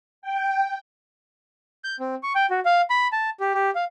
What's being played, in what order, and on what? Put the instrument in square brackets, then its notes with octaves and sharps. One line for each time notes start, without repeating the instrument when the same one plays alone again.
[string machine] G5
[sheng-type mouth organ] G6
C4
C#6
G5
F#4
F5
B5
A5
G4
G4
F5